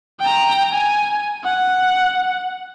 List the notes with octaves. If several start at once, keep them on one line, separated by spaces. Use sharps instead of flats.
G5 A#5
G#5
F#5